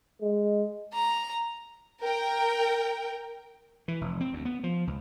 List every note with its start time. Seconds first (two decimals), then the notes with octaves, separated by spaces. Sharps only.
0.22 G#3
0.93 A#5
2.02 A#4 G5
3.88 E3
4.01 F1
4.21 C4
4.33 D2
4.45 B3
4.64 F3
4.87 C#2